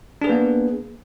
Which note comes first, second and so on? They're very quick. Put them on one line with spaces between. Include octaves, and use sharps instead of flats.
D4 G#4 B4 A#3 B3